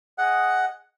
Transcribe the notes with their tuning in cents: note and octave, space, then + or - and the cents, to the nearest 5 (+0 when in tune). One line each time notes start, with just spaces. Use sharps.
G#4 +0 D#5 +0 F#5 +5